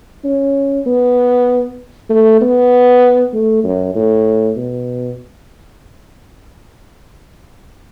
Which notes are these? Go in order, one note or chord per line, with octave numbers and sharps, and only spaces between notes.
C#4
B3
A3
B3
A3
F#2
A2
B2